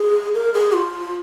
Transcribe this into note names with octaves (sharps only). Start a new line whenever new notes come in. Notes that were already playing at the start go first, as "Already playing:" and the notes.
Already playing: G#4
A#4
G#4
F4